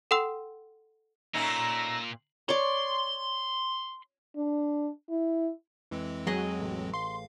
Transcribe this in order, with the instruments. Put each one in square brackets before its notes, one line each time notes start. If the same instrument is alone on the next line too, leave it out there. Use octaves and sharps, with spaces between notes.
[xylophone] A4 F#5 G5 C6 E6
[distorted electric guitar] A#2 [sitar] A3 C#4 D#4 [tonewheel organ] E6 A#6
[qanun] C#5 D5 [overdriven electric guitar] C6
[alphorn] D4
E4
[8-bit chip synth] F2 G#3 C4 [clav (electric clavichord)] E3
[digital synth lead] F#3 [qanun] G#4 D#5
[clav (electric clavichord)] A1
[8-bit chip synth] F5 [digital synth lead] C6